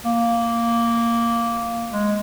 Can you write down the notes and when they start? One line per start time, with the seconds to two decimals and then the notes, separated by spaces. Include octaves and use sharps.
0.05 A#3
1.93 G#3